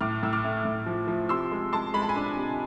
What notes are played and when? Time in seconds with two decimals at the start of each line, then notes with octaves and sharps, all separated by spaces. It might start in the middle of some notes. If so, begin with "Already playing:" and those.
0.01 A2 D6 F6
0.23 A2 E6
0.33 D6 F6
0.44 A3
0.65 A2
0.86 F3
1.07 F3
1.29 C3 C6 E6
1.52 G#3
1.73 G#3 A5 C6
1.94 G#3 B5
2.02 A5
2.09 G#5 B5
2.16 D4
2.37 C3